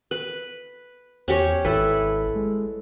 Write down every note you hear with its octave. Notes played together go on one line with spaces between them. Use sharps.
B4
E2 C#4 G4 C#5
G#1 E4 A4 B4
G#3